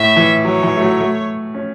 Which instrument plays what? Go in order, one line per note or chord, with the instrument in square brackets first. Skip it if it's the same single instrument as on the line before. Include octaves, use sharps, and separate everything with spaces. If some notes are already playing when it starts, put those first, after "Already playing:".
Already playing: [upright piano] A2 [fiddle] E5
[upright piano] E3
[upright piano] F#3 [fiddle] C#5
[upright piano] E3
A3
F#3
A3
C#4